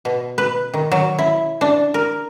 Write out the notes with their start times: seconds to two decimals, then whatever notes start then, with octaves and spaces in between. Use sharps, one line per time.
0.05 B2
0.38 B4
0.74 D#3
0.92 F#3
1.19 E4
1.61 D4
1.94 A#4